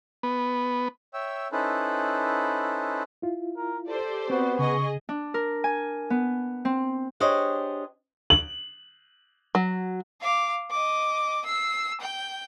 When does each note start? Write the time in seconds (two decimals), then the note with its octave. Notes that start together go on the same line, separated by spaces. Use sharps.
0.23 B3
1.14 C#5 E5 G5 E6
1.52 C#4 D#4 E4 A4 B4 C5
3.22 E4 F4
3.57 A#4
3.88 G4 A4 C5 D5
4.30 B3 C4 F#4
4.59 C#3 G#4 D#5 G#5 C#6
5.09 D4
5.34 A#4
5.64 G#5
6.10 B3
6.65 C4
7.20 D4 G4 G#4 C5 C#5 D#5
8.30 F#7
9.55 F#3
10.21 F5 D6
10.70 D#5 D6
11.45 E6 C7
12.01 G5 G6